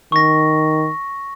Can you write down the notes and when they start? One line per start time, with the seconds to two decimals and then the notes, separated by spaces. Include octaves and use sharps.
0.12 D#3 C#6 A#6